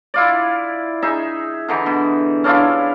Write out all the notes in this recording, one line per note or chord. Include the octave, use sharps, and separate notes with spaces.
E4 F4 D5
D#4 G#4 E5
D3 E3 D#4
B2
C#4 D4 E4 F4